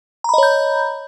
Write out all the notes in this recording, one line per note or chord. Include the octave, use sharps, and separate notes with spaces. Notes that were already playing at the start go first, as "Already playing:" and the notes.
C#5 D#5 A#5 B5 G6